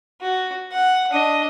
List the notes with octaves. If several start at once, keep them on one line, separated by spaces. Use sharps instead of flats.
F#4
F#5
D4 D#5